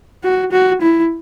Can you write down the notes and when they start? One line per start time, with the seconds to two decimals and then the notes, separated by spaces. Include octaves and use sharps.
0.23 F#4
0.52 F#4
0.82 E4